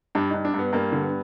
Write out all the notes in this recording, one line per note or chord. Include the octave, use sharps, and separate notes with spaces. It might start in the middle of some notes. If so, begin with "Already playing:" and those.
G2 D4
G2 D#4
D4
G2 B3
G2 A#3
D3
B3